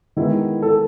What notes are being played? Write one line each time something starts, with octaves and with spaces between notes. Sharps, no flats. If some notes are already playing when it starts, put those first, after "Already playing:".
D#3 G#3 B3 E4
A4